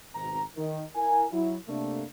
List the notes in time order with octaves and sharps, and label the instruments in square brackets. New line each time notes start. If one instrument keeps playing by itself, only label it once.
[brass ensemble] G#1 B2 D#3 C4 A#5
D#3
E4 A#4 G#5
F#3 E4
C3 A3 A#3 D4